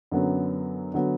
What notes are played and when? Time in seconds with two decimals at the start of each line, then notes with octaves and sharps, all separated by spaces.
0.11 F#2 D3 F#3 B3
0.94 D3 F#3 B3